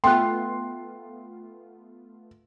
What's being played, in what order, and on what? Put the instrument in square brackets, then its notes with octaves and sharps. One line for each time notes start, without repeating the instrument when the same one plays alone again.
[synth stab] A3 B3 F4 [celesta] G5 F#6 [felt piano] C6